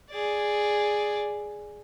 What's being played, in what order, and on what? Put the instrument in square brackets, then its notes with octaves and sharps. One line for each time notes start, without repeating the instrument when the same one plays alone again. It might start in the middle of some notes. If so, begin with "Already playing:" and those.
[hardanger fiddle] G#4 D5